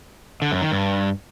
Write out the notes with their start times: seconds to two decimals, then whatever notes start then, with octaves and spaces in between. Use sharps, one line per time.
0.42 D3
0.52 F#2
0.62 D#3
0.72 G2